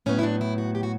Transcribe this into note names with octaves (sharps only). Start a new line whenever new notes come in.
A2 F#3 B3 C#4
E4
D4
E4
F#4
G4
F#4